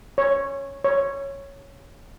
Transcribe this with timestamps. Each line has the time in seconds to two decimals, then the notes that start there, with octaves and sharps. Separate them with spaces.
0.18 C#5
0.84 C#5